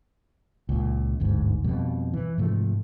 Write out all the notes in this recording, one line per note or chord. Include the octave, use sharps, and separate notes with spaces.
C#2 A#2
G1 D2 G#2
F2 B2 G3
E3
G#2 C3 F3 A3